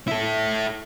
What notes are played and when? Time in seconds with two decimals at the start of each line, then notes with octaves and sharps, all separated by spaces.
0.08 E4 A4